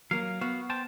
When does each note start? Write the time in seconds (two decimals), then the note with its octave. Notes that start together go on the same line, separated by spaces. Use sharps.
0.11 F#3 A#3 F5
0.41 B3 F#4 F5
0.70 C5 G5 A5